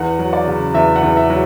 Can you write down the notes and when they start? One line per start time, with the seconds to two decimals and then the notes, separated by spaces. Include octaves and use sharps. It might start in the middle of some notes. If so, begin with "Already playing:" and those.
Already playing: E2 F#5
0.19 F#3
0.33 D5
0.47 C#3
0.74 E2 E5
0.96 F#5
1.03 E2
1.17 E5
1.30 F#3